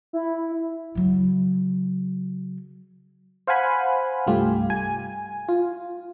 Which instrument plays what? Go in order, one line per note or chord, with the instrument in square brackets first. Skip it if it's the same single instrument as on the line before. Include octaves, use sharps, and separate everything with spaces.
[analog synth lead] E4
[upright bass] C#3 F#3
[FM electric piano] C5 F5 F#5 G#5 B5
C2 G2 A3 F4 G4
G#5
F4